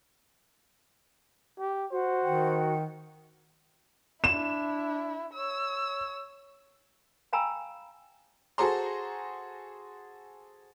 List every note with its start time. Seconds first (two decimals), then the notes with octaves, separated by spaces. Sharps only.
1.59 G4
1.91 F#4 C5 F#5
2.24 D#3 G5
4.24 D4 E4 E7
5.34 C#5 E6
7.33 F5 G5 G#5 A#5 B5 E6
8.58 F#4 G#4 A4 C5 A#5 C6